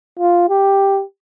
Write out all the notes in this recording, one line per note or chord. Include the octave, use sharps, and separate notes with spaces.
F4
G4